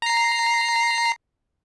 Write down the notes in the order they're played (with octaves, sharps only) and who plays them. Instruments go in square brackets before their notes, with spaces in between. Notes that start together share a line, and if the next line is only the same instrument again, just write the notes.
[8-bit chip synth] A#5 C7